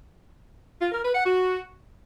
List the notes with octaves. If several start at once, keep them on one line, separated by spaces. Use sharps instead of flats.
F4
A#4
B4
F#5
F#4